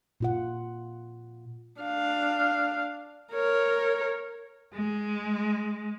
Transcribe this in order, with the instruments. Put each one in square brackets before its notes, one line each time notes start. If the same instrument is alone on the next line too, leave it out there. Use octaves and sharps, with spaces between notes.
[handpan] A#2 F4 F#5
[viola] D4 F5
A#4 C#5
[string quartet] G#3